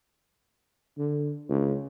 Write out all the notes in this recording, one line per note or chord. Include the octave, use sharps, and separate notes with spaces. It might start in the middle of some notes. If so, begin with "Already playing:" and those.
D3
C#2